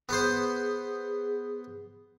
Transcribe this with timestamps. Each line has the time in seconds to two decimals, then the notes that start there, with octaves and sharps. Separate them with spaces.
0.09 B3 G#4 C5